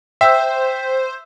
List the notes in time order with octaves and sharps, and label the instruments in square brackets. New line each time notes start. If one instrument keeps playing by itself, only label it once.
[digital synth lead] C5 [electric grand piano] E5 [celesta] G5 E6